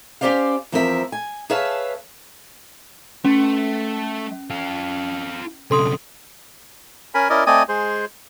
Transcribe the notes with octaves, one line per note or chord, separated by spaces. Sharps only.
C#4 D4 G4 C5 D5 F5
E2 F3 C4 A#4 B4 E5
G#5
G#4 B4 C#5 E5 F5 A5
A3 C#4
F4 A4
B1 C#3 A4 C6 D#6
C#4 A#4 G#5 B5
C#4 E4 A#4 D5 D#5
A3 C4 D5 D#5 G#5 D#6
G#3 G#4 C5